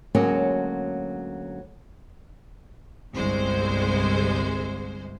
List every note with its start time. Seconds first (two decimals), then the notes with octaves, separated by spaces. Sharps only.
0.15 D2 F#3 G#3 A#3 C#4 G#4
3.13 G1 C2 G#3 C5